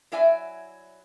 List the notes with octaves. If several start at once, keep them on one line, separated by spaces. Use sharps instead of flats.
F#3 E4 D5 E5 G#5